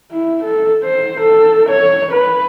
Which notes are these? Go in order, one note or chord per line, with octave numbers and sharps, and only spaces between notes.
E4
A4
C5
A4
C#5
B4